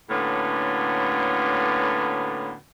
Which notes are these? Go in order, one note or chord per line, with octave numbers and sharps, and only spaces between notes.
A2 D3 A#3 B3 C#4 F#4